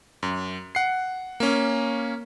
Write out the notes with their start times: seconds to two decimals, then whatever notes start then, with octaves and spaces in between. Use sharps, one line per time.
0.23 F#2
0.75 F#5 C7
1.40 A#3 C#4